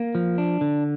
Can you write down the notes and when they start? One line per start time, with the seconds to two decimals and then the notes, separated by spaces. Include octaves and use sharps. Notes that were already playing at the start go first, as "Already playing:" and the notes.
Already playing: A#3
0.15 F3
0.38 D4
0.61 D3